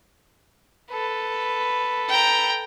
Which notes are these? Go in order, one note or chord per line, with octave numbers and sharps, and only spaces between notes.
A4 B4
G5 A#5